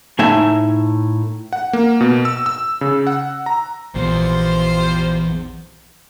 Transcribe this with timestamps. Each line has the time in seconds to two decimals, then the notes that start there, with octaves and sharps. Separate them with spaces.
0.19 A2 A3 D#4 E5 G#5
1.53 F#5
1.73 A#3
2.01 B2
2.25 E6
2.46 E6
2.81 C#3
3.07 F#5
3.46 A#5
3.95 A#1 E2 F4 G4 C5